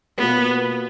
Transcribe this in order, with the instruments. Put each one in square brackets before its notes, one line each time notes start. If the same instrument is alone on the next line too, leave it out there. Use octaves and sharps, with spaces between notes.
[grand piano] B2 A#3 F4 B4 [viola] B3